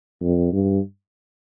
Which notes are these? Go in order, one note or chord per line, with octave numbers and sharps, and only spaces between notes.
F2
G2